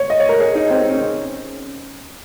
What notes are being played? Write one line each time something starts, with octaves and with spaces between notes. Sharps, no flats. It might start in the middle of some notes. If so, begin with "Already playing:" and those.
Already playing: C#5
D#5
C#5
A#4
G#4
D#4
C4
C4
C#4